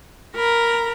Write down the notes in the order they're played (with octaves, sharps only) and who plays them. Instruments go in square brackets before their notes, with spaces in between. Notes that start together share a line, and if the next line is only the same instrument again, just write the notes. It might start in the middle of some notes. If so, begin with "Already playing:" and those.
[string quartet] A#4 A#5 B5